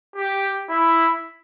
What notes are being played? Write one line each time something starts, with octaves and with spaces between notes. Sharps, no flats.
G4
E4